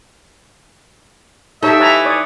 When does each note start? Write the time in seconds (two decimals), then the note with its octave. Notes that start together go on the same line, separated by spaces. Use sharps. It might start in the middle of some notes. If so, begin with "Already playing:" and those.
1.63 D#4 G4 A4 C#5 E5 F5
1.80 E3 C#5 A5 A#5
2.05 C#5 D5 D#6